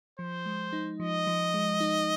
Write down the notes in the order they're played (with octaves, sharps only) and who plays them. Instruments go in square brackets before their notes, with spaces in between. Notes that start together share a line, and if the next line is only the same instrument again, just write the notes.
[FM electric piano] F3 [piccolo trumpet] C5
[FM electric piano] G#3
D#4
[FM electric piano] F3 [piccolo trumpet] D#5
[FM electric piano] F3
G#3
D#4